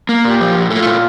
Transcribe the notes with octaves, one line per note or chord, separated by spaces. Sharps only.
A#3
A#2 G4
F3
A#2
A3 F4
A#2